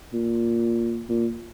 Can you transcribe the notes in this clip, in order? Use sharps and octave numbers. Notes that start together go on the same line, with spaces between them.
A#2
A#2